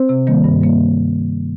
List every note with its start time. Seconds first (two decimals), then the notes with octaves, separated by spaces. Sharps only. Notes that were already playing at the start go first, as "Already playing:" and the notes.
Already playing: C4 C5
0.09 C3
0.27 D#3 G3 A#3
0.44 G2
0.61 G3 A#3